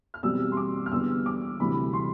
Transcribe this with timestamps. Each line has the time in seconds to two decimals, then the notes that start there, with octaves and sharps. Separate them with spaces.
0.14 F6
0.23 E2 B2 G3 C4 E6
0.52 C6
0.57 D6
0.86 F6
0.92 E2 D3 G3 B3 E6
1.26 D6
1.60 D2 C3 E3 G3 B5
1.93 C6